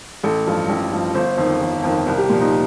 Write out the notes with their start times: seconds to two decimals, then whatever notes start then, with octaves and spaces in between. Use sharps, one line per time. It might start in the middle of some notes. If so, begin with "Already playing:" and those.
0.24 A1 A4
0.46 G2 F3
0.69 A1
0.91 G2 F3
1.15 G1 C5
1.38 F2 D#3
1.60 G1
1.84 F2 D#3
2.06 C2 A#4
2.18 G4
2.29 A#2 F3
2.41 D#4